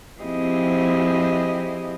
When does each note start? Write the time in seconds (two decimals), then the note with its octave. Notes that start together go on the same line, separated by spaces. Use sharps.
0.20 F3 C4 E4 G4 G#4 D#5